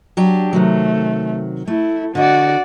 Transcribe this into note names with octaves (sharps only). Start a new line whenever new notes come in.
F#3 D4 G4
C3 D#3 F#3 A3
A3 E4
D3 F#4 D5 D#5